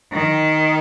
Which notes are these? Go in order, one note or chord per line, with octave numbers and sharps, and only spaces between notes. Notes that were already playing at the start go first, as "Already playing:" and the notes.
D#3